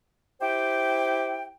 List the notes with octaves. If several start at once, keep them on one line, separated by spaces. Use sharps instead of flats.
E4 G4 C5 G5